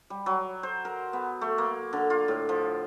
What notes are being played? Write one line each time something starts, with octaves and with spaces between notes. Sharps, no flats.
G3
F#3
C5
A#4
B3
A3
A#3
D3
F4
A2
F3